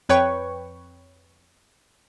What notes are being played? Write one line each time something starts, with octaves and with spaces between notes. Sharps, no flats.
F2 B4 C#5 G5 C#6